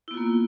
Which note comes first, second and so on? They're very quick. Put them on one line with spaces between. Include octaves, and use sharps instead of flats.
E4 B3 F4 A#3